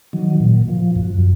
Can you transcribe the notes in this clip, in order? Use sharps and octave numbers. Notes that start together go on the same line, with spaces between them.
D#3 F#3
A#2
F3
F#2